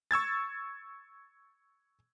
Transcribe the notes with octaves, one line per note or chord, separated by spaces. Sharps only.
C#6 E6 G#6 A6